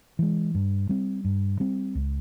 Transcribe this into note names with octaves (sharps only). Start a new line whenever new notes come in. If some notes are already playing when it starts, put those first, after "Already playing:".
E3 G#3
G2
G3 C4
G2
G3 C4
C#2